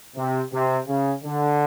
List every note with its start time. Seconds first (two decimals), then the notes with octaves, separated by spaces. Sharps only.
0.16 C3
0.53 C3
0.88 C#3
1.24 D3